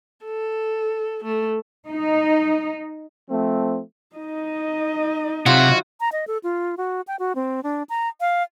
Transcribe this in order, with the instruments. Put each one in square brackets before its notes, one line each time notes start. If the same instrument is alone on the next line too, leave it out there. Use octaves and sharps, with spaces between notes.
[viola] A4
A3
[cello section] D#4
[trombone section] F3 A3 C4
[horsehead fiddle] D#4 D#5
[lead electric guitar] C3 [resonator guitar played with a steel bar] F#3 F4 [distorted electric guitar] F#4
[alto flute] A#5
D#5
A4
F4
F#4
G5
F#4
C4
D4
A#5
F5